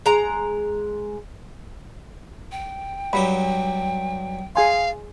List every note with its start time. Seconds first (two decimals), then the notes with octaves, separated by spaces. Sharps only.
0.06 G#3 A#5
2.52 G5
3.13 G2 F#3 G4 B5
4.56 G#4 F5 G#5 C6